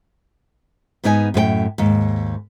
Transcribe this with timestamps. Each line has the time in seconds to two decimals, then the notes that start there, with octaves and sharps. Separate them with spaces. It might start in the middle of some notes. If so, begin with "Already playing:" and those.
1.04 G#2 B3 D#4 C#5 G#5
1.34 F#2 A2 B4 G5
1.78 D#2 G#2